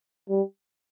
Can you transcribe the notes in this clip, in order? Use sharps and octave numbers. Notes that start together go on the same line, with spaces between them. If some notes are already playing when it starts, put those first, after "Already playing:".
G3